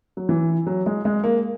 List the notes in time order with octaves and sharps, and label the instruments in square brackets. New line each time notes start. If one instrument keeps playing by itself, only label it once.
[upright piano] F#3
E3
F#3
G#3
G#3
A#3